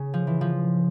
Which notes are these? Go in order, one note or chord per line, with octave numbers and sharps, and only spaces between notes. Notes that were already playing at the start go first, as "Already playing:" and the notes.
Already playing: C#3
F3
E3
F3